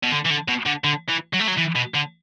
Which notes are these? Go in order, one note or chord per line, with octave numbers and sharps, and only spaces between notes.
B2
D3
E3
D3
B2
D3
D3
E3
F#3
A3
F#3
E3
B2
D3